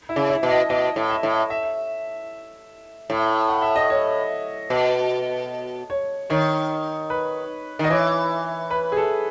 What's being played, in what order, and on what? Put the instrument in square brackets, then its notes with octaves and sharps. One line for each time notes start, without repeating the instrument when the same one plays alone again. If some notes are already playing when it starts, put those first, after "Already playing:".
[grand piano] E4
[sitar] C#3
[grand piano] E4
[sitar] B2
[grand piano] D#5
[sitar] B2 [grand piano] D#5
[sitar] A2
[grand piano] E5
[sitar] A2
[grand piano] E5
[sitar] A2
[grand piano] F#5
E5
D#5
C#5
[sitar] B2
[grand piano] C#5
[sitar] D#3 [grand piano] C#5
[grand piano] B4
[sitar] D#3 [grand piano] D#5
[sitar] E3 [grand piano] C#5
[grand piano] B4
G#4
A4